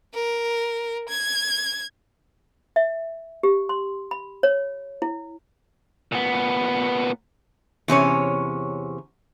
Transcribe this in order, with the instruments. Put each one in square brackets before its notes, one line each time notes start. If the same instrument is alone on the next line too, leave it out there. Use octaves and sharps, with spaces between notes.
[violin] A#4
G#6
[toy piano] E5
G4
C6
B5
C#5
E4
[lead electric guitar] A#2 B3
[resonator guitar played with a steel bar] E2 C3 C#4 C#5